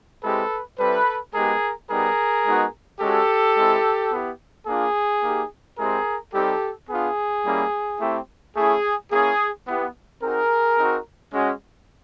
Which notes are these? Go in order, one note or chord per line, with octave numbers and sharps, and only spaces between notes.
G#3 C4 E4 G4 A4 B4
G3 C4 E4 A4 B4
G#3 B3 D#4 G4 G#4 A#4
G3 B3 D#4 G4 G#4 A#4
G#3 B3 D#4 F#4
G#3 C#4 F#4 G4 A4
G#3 C4 E4
B3 E4 G4
A#3 D4 F4 G#4
A#3 D#4 G4
G#3 C4 E4 G4 G#4 A#4
G3 C4 D#4 G4 A4
B3 D4 F4 G#4
G3 A#3 C#4 E4
A3 C4 E4 G4
A3 C#4 E4 G#4
A#3 C#4 E4 G#4
B3 E4 G4
C4 D#4 F#4 G#4 A#4
C4 D#4 F#4
G#3 C#4 F#4